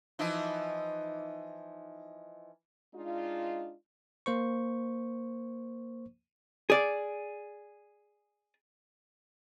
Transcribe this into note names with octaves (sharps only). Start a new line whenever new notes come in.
E3 F3 D#4
G#3 D4 D#4 F4
A#3 C5 C#6
G#4 D5